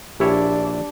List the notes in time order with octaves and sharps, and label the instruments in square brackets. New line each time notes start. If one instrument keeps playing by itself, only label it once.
[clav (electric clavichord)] A#1 E4 C#5 [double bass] D4 [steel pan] G4